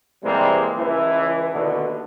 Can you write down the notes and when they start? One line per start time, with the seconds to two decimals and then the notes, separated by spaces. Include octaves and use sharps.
0.23 C3 E3 G3 G#3 A#3 C4
0.75 C#2 E3
1.53 D#2 B2 D3